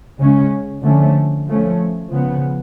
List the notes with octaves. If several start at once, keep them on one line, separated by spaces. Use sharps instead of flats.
C#3 G#3 C#4
D3 F3 A3 C#4
F3 A3 C#4
C#3 F3 B3